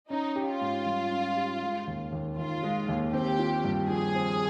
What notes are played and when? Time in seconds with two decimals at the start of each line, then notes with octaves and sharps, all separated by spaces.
0.10 C#4 D#4
0.36 G4
0.48 F4
0.61 G#2
0.86 G3
1.11 C#4
1.37 G4
1.62 G#3
1.87 D#2
2.12 D#2
2.38 D#3 F4
2.63 G#3
2.89 D#2
3.13 C4 G4
3.39 F4
3.64 G2
3.90 F3 G#4
4.15 C4